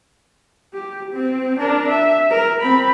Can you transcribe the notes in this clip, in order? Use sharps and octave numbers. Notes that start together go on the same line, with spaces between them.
G4
C4
D4 A#4
E5
A#4
C4 B5